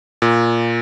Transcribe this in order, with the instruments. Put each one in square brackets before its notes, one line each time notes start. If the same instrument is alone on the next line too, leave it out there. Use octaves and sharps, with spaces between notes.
[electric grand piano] A#2